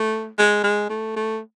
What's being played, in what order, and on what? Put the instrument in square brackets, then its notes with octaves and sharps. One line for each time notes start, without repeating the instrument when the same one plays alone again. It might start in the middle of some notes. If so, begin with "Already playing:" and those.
Already playing: [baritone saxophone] A3
G#3
G#3
A3
A3